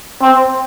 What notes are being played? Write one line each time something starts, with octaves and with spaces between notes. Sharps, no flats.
C4